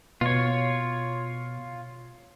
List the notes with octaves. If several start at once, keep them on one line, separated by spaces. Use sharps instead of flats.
B2 F4 C#5